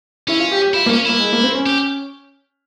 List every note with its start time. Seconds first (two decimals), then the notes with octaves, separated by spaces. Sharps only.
0.28 C#4 E4
0.39 F4
0.51 G4
0.62 G4
0.74 E4 F4
0.86 A#3
0.90 C#4
1.05 A#3 E4
1.20 G#3
1.33 A#3
1.43 C4
1.55 C#4
1.66 G4